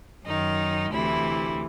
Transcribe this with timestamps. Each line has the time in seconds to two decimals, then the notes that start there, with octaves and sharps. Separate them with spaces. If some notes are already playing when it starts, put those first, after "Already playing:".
0.25 F#2 D#3 D#4
0.92 D2 C3 E3 E4